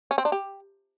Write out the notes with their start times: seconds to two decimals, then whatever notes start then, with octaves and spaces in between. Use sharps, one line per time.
0.11 C#4
0.18 C4
0.25 D4
0.32 G4